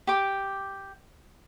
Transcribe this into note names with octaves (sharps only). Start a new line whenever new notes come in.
G4 D6